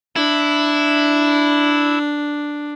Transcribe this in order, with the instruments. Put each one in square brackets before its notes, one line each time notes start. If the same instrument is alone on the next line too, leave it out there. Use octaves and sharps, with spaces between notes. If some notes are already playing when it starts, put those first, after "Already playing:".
[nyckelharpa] D4 [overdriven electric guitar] E4